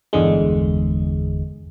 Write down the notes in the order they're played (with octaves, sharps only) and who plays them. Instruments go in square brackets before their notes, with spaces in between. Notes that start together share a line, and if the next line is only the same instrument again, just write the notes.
[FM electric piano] G1 E2 D3 G#3